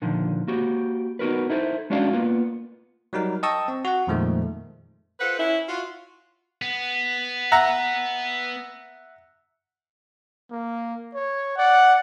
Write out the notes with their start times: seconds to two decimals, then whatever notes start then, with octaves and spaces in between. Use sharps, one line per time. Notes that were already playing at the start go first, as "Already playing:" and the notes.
0.02 A#2 D3 D#3 F3
0.48 A#3 F#4 G4
1.19 B3 D#4 F#4 A#4 B4
1.50 D#4 E4 A4 C5
1.90 G#3 C#4 D4 F#4 D5 F5
2.13 A#3 B3 F4
3.13 F#3 G3 D#4 A#4
3.43 D#5 G5 A5 C#6 D#6 E6
3.68 C4
3.85 F#4 F#5
4.07 F2 A#2 D#3 F3 G#3 A3
5.21 F4 A4 B4 C5 F#5
5.38 C#4 E4
5.68 F4 F#4
6.62 B3
7.52 E5 F#5 A#5
10.51 A#3
11.14 C#5
11.58 D5 F#5